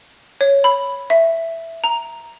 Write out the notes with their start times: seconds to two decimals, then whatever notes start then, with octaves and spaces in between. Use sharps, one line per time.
0.41 C#5
0.64 B5
1.10 E5
1.84 A#5